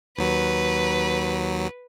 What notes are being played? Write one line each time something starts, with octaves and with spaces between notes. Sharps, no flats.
D#2 F#3 B4